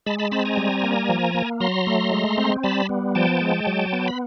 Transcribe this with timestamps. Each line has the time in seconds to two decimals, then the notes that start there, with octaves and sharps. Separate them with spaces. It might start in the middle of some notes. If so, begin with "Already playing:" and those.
0.06 G#3 A5 B5
0.19 A5 B5
0.31 C4 A5 B5
0.45 G#5 A#5
0.57 G3
0.83 A#3
1.09 F3
1.35 A#3
1.60 F#3 A#5 C6
1.87 A3
2.12 G#3
2.38 C4
2.63 G3 A5 B5
2.89 B3
3.15 F3 G5 A5
3.41 G#3
3.67 F#3
3.93 B3
4.08 B5